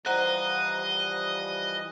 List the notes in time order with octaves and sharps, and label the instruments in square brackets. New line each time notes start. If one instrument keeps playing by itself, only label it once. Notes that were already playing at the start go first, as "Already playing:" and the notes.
[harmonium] E3 F3 G3 [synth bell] C5 F#5 A#5 [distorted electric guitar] D#5 [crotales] F#6